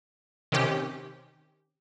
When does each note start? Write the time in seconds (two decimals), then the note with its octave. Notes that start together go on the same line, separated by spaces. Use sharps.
0.52 C3 D#3 C#4 G4